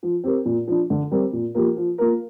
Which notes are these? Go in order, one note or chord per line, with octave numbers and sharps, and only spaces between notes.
F3
C4 G4 A#4
A#2
F3 D4
D3
G3 C4 A#4
A#2
F3 A#3 G4 A#4
F3
A#3 F4 A#4